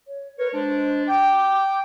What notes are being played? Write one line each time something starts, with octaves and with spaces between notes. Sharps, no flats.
C#5
A#4 B4 C#5
G#3 D4 C5
G5 D6